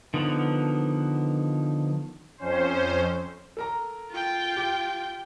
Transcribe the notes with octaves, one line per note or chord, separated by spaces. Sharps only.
D3 D#3 F3 B3
F2 C#4 C5
A4 A#4 A#5
F4 G5
G4